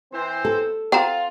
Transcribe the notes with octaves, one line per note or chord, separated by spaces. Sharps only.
E3 C4 C5
A4
C4 F4 F#5 A#5